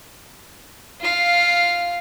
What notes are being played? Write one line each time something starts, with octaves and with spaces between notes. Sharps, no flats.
F4 F5